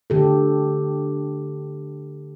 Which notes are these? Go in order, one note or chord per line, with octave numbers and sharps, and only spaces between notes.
D3 G4 A4